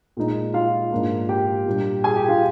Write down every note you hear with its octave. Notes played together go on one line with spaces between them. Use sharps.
A#2 G#3 D#4
F4 F5
G#2 F3 A#3 D4 F4
G4 G5
A#2 G3 D4 F4
G#4 G#5
G4 G5
F4 F5